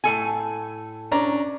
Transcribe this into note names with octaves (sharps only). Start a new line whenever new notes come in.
A2 A4 G#5
C#4 D4 A#5